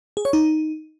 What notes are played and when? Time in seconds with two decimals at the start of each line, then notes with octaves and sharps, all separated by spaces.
0.17 G#4
0.25 C#5
0.33 D#4